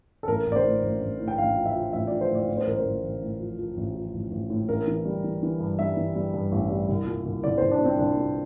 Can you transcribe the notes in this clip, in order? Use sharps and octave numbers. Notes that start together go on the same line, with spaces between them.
A4
A1 A#4
A1
D5
C5
A2
A1
A1
A2
G5
A1 F5
F3
E5
F3
A1 E5
F3 D5
C5
A2 D5
A2 D5
C5
A1 A#4
C5
A1
A1
A2
F3
F3
A1
F3
A1
A1
A2
A1 A#4
E3
G3
E3
E3
G2
G3 E5
E3
G3
G2
A1
G3
C2
A#2
C2
C2 D5
C2 C5
D4
A#2 C4
C2 D4
A#2